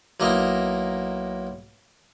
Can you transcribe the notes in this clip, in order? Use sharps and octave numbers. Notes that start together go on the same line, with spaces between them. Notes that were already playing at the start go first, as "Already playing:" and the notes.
B1 A#3 E4 D#5 A#5